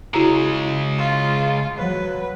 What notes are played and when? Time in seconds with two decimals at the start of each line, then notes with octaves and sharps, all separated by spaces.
0.14 C#3 G#3 E4 F#4 A#5
0.98 F4
1.78 F#3 B4